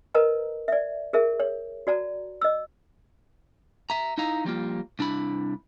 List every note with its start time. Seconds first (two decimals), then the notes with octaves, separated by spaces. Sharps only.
0.14 A#4 B4 D#5 A5 A#5
0.68 D5 E5
1.13 G#4 A#4 E5 A5
1.40 C#5
1.87 F#4 D5 A5 A#5
2.41 D#5 E6
3.90 E5 A#5
4.18 D#4 E4 D#5 F5 A#5
4.45 F3 G3 A#3 F4
4.99 C2 D4 E4 B5